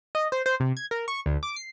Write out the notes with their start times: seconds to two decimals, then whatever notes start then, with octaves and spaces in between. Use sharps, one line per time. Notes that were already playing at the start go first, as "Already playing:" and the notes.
0.15 D#5
0.32 C5
0.46 C5
0.60 C3
0.77 G#6
0.91 A#4
1.08 C#6
1.26 D2
1.43 D6
1.56 C7